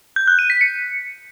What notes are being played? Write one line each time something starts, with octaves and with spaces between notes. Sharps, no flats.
G6
F#6
D#7
B6
C#7